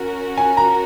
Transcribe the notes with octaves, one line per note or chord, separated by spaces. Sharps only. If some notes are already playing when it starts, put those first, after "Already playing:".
Already playing: C#4 F#4 A#4
G#5
A#5